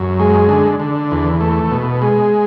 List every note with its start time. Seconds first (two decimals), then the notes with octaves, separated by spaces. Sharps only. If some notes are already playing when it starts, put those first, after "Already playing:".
Already playing: F#2
0.19 G#3
0.49 D3
0.80 D3
1.11 E2
1.40 A3
1.71 B2
2.02 G#3